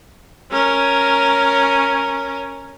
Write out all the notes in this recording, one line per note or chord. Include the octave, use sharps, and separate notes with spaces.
C#4 A#4